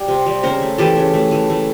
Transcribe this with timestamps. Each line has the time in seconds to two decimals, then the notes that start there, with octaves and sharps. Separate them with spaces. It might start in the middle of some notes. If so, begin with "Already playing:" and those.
Already playing: G3
0.08 C3
0.26 G3
0.43 C#3 A#4 C5
0.61 A3
0.78 E3 G4 A4
0.97 C#3
1.13 A3
1.31 E3
1.50 A3